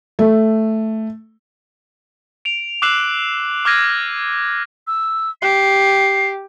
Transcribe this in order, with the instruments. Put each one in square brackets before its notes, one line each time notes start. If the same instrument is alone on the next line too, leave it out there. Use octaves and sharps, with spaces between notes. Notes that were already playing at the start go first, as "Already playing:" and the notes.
[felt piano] A3
[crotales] D7 F7
D6 E6 F#6 C7 E7 F#7
D6 F6 F#6 G#6 A#6 D#7
[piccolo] E6
[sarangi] G4 [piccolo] C7